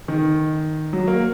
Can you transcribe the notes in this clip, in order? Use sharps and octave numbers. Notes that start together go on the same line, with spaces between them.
D#3
F#3
A#3